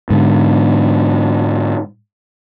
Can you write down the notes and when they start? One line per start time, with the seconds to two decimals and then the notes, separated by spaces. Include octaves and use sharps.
0.10 G#2 D3